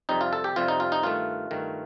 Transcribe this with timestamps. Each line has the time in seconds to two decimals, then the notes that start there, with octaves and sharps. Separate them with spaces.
0.09 F2 C3 G3 C4 D#4
0.21 F4
0.33 A4
0.44 G4
0.56 F2 C3 G3 C4 F4
0.68 D#4
0.80 F4
0.92 D#4
1.03 G2 D#3 A3 F4
1.51 G2 D#3 A3